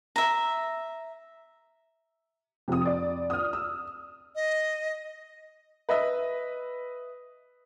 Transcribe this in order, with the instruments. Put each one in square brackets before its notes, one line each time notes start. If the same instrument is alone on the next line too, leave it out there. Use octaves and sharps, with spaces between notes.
[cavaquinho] E5 A#5
[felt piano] F2 F3 [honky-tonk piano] C3 D#6
[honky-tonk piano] D5
D#6 F6
[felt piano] E6
[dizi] D#5
[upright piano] B4 D#5 E5